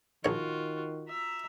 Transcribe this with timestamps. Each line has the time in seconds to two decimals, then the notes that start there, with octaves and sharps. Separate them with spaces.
0.25 A#1 D#3 F4 F#4 C#5
1.09 E5 A#5